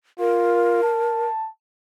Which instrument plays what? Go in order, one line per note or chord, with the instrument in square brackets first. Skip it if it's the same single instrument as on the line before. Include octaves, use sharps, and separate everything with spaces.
[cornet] F4 [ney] A#4
[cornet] A5